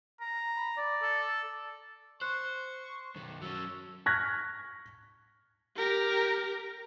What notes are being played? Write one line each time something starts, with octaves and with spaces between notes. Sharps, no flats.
A#5
B5
D5
A4
C5 C#6 F#6
B1 D#3
F#3 C#4 A4
C#6 F6 F#6 G#6 A#6 B6
G4 A#4